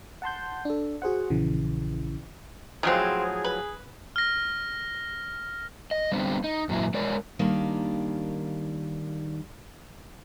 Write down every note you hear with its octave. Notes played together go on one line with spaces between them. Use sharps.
F#5 A5 C6 G6
D4 A4
F#4 G#4 C5 F#5
A#1 C#3 E3
A2 C#3 F3 F#3 G#3 C4 G#4
B4
F6 A#6
D#5
G3 B3 C4 D4
D#4
F#2 A#2 F#3 E4
G#3 A#4 C#5 D5
D#2 D#3 G3 A#3 D4